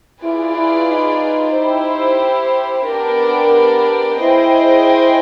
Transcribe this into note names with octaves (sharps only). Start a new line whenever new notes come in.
E4 F4 G#4 B4 D5
E4
D#4
E4 G4 C5
B3 D4 G4 A#4 D5
E4 G#4 C5 D#5 G5